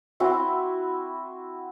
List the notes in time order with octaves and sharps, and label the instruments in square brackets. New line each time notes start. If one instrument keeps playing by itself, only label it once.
[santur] C4 E4 F#4